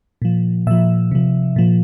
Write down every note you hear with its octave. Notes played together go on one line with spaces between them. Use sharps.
A#2 F3
A#2 F3 E5
C3 F3
A#2 F3